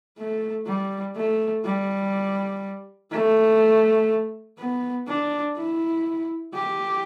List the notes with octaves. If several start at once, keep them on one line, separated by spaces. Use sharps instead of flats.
A3
G3
A3
G3
A3
B3
D4
E4
G4